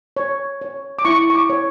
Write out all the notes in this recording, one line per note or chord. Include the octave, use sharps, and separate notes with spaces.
C#5
C#5
D6
E4 C#6
C#6
D6
C#5